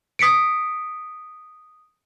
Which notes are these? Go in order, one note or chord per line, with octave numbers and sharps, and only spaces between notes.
D#6 B6 C#7 D7